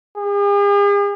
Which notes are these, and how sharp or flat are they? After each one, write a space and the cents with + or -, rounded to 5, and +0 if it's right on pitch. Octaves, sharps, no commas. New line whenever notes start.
G#4 -45